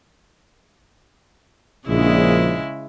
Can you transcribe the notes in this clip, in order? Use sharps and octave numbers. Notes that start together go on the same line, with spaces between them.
A#1 C#3 G#3 E4